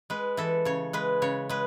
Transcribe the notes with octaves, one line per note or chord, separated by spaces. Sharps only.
G#3 B4
E3 A4
C#3 C#5
G#3 B4
C#3 C#5
G#3 B4